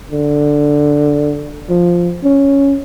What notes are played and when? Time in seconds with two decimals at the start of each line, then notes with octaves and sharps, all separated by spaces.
0.11 D3
1.70 F3
2.24 C#4